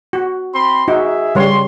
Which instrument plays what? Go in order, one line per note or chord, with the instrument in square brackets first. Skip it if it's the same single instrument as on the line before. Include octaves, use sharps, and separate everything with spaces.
[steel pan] F#4
[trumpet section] C4 B5 C6
[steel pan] D#4 F#4 [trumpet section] G#4 E5
[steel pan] C#3 G3 C#5 [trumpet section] C6